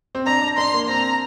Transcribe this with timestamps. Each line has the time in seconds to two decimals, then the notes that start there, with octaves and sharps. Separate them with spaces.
0.15 C4
0.26 D4 A#5
0.41 D4
0.57 D4 C6
0.74 A#3
0.88 C4 A#5